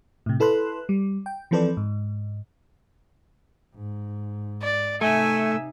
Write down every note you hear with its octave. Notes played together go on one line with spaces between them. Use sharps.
A2 C3
E4 A4 B4 C6 F#6
G3
G5
E3 F3 C4 A4 B4 D5
G#2
G#2
D5
C3 A3 D#4 E5 G#5